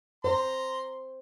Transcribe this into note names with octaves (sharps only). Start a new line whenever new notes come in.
C5 A#5 C6